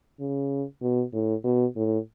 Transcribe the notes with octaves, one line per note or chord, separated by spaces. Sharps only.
C#3
B2
A2
B2
A2